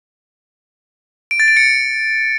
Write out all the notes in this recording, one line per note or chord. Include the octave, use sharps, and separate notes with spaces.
D7
A6
D7
C#7